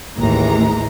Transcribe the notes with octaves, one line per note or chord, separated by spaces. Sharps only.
A1 D#2 A2 E3 G#3 A#5